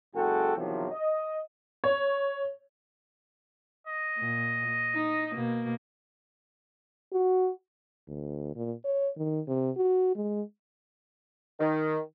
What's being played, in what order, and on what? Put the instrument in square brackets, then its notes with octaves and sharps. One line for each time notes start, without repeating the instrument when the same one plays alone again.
[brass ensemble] F#1 G#3 F#4 A4 G5
E2 C3 D#3 F3 F#3
D#5
[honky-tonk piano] C#5
[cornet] D#5
[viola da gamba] A#2
D#4
B2 A#3
[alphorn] F#4
[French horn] D2
A#2
C#5
D#3
C3
F#4
G#3
[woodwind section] D#3